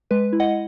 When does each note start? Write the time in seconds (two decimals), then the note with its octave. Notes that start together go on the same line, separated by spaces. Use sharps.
0.11 G#3 B4
0.33 E4
0.40 D#5 F#5